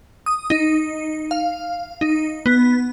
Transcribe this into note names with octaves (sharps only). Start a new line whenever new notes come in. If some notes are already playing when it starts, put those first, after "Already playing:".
D#6
D#4
F5
D#4
B3